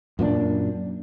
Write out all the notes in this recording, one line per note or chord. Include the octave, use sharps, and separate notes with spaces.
F#2 A#2 A#3 D4